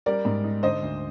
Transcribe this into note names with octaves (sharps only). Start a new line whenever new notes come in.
G3 A#4 D5
G#2
D#4
D3 C5 D#5
D2